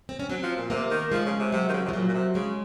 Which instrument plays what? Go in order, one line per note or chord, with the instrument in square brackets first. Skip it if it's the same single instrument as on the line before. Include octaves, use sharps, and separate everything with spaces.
[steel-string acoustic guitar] C4
C#4
[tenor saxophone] F#3 [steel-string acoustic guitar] C4
[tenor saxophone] F3
A#2
[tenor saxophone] C3 [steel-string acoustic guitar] A#3
[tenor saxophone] D#3
[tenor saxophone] F3 [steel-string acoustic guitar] G#3
[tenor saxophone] C#3
C3
[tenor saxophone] C3 [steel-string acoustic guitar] F#3
[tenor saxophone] D#3
C#3
[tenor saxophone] C3 [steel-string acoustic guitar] F3
[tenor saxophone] A#2 [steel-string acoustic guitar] F#3
[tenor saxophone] A#2
C3
[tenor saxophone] C#3 [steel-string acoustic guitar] G#3